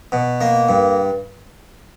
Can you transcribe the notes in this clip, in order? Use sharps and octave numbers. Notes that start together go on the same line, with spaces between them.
B2
A#3
G2